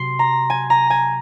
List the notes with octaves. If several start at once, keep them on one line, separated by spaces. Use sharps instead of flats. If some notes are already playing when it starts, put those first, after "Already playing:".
Already playing: C3 F#3 C6
A#5
G#5
A#5
G#5